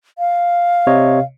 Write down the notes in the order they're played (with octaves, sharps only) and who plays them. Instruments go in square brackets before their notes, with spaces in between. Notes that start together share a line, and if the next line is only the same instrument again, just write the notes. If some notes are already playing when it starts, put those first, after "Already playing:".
[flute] F5
[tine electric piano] C3 C#5 D#5